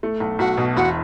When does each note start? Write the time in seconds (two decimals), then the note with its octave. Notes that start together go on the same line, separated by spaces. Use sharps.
0.03 A3
0.20 B1
0.39 B1 F#4
0.57 B2
0.76 E1 F#4